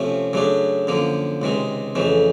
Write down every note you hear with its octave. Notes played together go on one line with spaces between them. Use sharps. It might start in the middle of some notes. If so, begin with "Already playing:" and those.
Already playing: C3 F3 A3 C#4
F#2 C#3 F#3 A3 D4
F#2 D3 F3 A#3
C#2 C3 D#3 G#3
F2 C#3 E3 A3